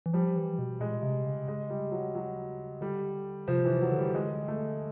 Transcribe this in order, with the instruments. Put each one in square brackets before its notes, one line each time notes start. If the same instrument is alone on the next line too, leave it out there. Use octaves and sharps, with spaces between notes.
[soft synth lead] E3
[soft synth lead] F3 [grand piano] G3
[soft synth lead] E3
B2
[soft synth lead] A#2 [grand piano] G#3
[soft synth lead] C3
C#3
[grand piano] G#3
G3
F#3
F#3
[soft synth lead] D3 [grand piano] G3
[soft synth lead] C3 [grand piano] F3
[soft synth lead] C3 [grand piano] E3
[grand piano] F#3
[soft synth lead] D3
[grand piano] G3
G#3
A3